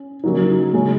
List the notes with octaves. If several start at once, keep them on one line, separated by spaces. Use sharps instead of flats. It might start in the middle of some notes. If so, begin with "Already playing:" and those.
Already playing: C#4
C#3 F#3 A#3 D#4
C#3 G#3 C#4